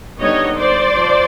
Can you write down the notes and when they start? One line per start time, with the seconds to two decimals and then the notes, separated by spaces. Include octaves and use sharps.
0.21 D3 G3 B3 D#4 C#5 D#5
0.59 C5 D5
0.96 F3